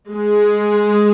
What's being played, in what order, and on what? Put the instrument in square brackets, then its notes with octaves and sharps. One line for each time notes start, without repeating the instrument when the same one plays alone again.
[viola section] G#3